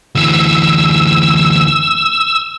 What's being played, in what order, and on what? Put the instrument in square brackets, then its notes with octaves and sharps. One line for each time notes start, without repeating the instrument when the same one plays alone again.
[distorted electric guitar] D2 E3 [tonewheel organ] E6